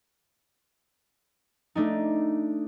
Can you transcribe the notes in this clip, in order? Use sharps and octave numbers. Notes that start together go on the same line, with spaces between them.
A3 D4 D#4